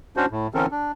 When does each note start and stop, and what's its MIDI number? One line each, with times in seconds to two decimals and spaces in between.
0.17 0.26 61
0.17 0.26 62
0.17 0.26 66
0.17 0.26 72
0.31 0.47 45
0.54 0.66 50
0.54 0.66 52
0.54 0.66 60
0.54 0.66 61
0.54 0.66 69
0.54 0.66 70
0.71 0.92 62